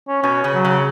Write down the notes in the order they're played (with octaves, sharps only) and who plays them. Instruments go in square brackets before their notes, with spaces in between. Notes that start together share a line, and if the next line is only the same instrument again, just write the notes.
[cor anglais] C#4
[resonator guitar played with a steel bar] B2 [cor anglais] C#4
[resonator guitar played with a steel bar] C#3
[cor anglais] F#3
[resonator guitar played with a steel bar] C#3